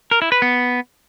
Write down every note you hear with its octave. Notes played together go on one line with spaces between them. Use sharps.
A#4
E4
B4
B3